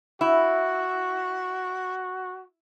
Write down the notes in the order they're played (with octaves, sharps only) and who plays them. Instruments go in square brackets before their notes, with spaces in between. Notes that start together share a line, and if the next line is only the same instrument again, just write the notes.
[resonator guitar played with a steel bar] E4 [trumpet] F#4